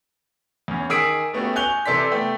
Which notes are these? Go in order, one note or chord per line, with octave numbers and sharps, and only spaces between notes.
E2 C#4
D#3 G#4 D#6 E6 B6 D7
A3 B3 C#4 F#4 G4
G#5 C#6 F#6 G6 F7 G7
C3 E3 A4 D5 C6 B6
A3 B3 G5